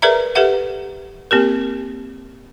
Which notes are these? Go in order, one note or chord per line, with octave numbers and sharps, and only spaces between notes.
G#4 A#4 B4 D5 E5 A#5
G4 A4 B4 E5 F#5
A#3 C4 G4 A#4